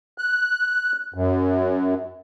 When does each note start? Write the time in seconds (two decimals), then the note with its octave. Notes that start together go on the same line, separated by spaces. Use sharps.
0.18 F#6
1.14 F#2